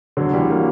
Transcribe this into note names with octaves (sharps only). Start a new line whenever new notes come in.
D3 F#3
E3 G3
F#3 A#3